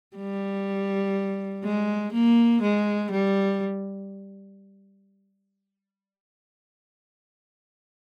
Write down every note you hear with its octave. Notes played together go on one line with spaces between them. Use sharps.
G3
G#3
A#3
G#3
G3